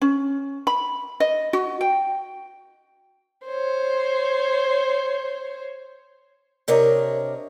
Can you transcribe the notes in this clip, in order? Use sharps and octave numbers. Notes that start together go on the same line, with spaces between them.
C#4
B5
D#5
F#4
G5
C5 C#5
C3 D4 A#4 C#5 D#5